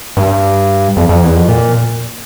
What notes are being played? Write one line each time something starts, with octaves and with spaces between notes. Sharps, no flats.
G2
F2
F2
E2
F2
A#2